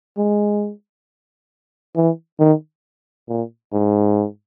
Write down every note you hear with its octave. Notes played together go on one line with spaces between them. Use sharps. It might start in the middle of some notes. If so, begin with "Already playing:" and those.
G#3
E3
D#3
A#2
G#2